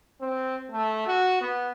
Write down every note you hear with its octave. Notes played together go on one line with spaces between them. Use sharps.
C4
A3
F#4
B3